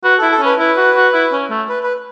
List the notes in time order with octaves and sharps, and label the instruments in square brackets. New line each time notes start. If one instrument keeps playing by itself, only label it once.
[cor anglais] F#4 [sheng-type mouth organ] B4
[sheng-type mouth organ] A4
[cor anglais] E4
[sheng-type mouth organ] A4
[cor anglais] C#4 [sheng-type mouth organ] B4
[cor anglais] E4 [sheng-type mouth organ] B4
[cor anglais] F#4
F#4
E4
C#4
A3
[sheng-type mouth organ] B4
B4